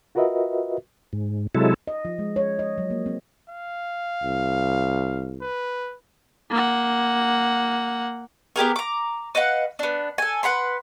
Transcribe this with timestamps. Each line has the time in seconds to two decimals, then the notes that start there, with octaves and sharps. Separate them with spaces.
0.15 F4 F#4 A#4 B4 D#5 E5
1.13 G#2
1.55 C3 F#3 G#3 E4 A4
1.87 D#5
2.05 F3
2.19 G#3
2.36 C#5
2.59 D#5
2.78 F#3
2.90 A#3
3.06 C4
3.49 F5
4.23 C2
5.41 B4
6.51 A#3 F#5
8.56 B3 G4 G#4 A#4
8.76 A#5 D6
9.35 B4 D#5 F5 F#5
9.79 B3 D4
10.18 A4 G#5
10.43 B4 F#5 B5 C6